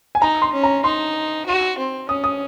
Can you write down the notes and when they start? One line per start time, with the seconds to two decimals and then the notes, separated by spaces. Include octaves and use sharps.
0.15 G#5
0.21 D#4 A#5
0.42 C6
0.53 C#4
0.64 A#5
0.84 D#4 C6
1.46 F#4
1.78 C4
2.09 C#4 D#6
2.24 D#6